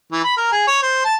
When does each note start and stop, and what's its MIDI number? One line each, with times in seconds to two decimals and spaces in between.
0.12 0.23 52
0.23 0.36 83
0.37 0.48 70
0.52 0.65 68
0.67 0.81 73
0.83 1.04 72
1.05 1.15 81